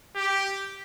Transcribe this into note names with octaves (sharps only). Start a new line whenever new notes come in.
G4